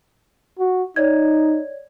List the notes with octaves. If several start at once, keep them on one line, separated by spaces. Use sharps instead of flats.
F#4
D#4 C#5 D5 G#6